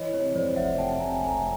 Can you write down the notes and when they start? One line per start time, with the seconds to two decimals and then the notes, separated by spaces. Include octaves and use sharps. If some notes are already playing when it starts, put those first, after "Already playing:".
Already playing: E3 C#5 D#5
0.13 C3 C#5
0.34 F2 C5 D5
0.56 F1 E5 F#5
0.78 C3 G5 A5
1.00 C3 G#5 A#5
1.22 F1 G#5 A#5